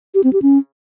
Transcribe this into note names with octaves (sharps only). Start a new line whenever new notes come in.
G4
C4
G4
C#4